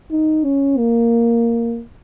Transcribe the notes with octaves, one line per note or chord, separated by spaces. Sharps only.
D#4
C#4
A#3